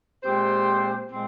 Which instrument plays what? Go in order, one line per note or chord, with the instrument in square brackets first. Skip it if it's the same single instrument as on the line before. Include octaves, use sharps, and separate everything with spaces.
[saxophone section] A#2 G#3 C4 G4 C5
A#2 G#3 C4